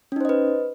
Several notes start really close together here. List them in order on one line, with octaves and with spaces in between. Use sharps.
C#4 D#4 C5 D#5 B4